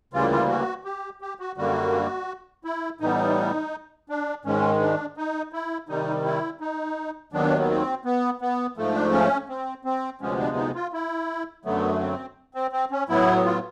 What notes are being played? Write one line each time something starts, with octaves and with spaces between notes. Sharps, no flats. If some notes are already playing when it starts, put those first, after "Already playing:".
D2 C#3 E3 G3 A#3 F4
F4
F#4
G4
G4
F#4
F#2 D3 G3 A#3 F#4
E4
A2 E3 G3 B3 D#4
D4
G#2 D#3 G#3 C#4
D4
D#4
E4
C3 D#3 G3 D#4
E4
D#4
D#2 D#3 F#3 B3 D4
B3
C4
B3
B3
G#2 F3 A3
D4
C#4
C4
C4
D2 C3 F3 G#3 B3 C#4
D4
D#4
F4
E4
F#2 D3 F#3 A3 B3
C4
C4
C4
C#4
A2 F#3 B3 E4
F4